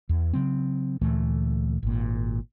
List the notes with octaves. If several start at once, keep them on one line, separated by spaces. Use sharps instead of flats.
E2
C#3 F#3 C4
D2 A#2 E3 A3
G#1 A#2